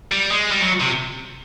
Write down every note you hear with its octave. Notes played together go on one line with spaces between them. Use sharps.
G3
G#3
G3
F#3
C3